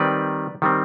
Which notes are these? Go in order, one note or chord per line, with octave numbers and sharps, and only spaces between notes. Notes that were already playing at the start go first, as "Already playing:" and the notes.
Already playing: D#3 G3 C4 B4 D5
D#3 G3 C4